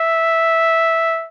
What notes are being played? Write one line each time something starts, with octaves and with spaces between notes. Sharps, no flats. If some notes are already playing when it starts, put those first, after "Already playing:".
Already playing: E5